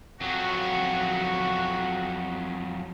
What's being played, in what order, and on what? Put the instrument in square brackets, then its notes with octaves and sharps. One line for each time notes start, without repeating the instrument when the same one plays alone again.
[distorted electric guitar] F2 F#3 [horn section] F#4